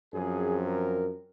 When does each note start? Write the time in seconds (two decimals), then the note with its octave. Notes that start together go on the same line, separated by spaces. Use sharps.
0.14 F#2 F3 C4 G#4
0.64 A#4